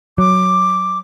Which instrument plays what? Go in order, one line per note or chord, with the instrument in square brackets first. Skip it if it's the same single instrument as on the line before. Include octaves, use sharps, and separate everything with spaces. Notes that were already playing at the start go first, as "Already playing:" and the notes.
[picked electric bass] F#3 [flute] D6